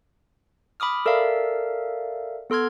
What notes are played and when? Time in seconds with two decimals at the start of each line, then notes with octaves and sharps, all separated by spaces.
0.80 B5 D6 D#6 F6
1.06 A4 A#4 D5 E5 F5
2.50 B3 A4 C6 F6 G#6